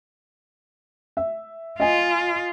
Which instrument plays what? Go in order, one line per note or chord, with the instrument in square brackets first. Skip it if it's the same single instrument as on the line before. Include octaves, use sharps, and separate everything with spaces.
[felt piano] E5
[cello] F4 [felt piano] D#5 G#5